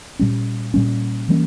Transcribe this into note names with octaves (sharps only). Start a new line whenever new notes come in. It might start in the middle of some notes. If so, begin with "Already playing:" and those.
A#2 G3 C#4
A#2 G3 C#4
E3 G3 A#3 C#4